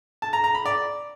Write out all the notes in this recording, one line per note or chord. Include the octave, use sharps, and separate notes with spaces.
A5
A#5
A#5
B5
D5